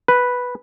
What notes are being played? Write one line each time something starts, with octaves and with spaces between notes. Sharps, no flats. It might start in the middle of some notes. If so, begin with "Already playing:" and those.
B4